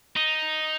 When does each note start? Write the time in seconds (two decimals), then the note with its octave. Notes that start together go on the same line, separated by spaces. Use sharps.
0.17 D#4